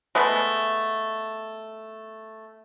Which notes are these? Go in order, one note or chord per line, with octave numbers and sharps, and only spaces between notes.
G#3 A3 B3